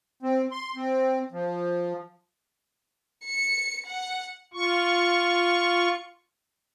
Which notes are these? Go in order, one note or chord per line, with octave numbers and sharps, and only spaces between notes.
C4
C6
C4
F3
C#7
F#5
F4 C#6